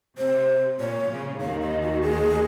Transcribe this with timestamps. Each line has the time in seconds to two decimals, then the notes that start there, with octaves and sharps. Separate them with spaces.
0.18 C3 C5
0.80 A#2 C#5
1.10 C#3
1.41 D#2 D#3 F5
1.62 D#5
1.82 F#4
2.03 G#4